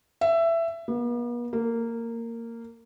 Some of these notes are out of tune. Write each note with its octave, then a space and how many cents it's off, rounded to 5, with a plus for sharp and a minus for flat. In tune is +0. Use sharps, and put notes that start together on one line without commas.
E5 +15
B3 -45
A#3 -15